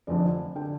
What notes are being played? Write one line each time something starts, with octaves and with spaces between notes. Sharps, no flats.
F1 F2 D3 D5
D3 G5